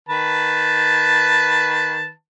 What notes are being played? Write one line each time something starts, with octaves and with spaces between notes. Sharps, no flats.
D#3 B4 A5